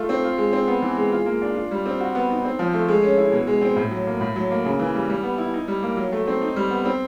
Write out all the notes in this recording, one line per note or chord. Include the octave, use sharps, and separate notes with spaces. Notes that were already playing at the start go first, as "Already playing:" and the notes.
Already playing: A3 F4
C4
F4
G#3
C4
B3
E3
G#3
F4
A#3
D4
F4
G3
C4
F#4
B3
D#4
C4
F3
A3
G#3
C#4
E4
B2
G#3
C4
A2
F#3
A#3
A2
F#3
A#3
C#3
E3
G3
G3
B3
E4
D#4
G3
A#3
F#3
A3
C4
D#4
G3
B3
C4